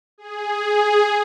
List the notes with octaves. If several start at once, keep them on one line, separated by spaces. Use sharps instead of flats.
G#4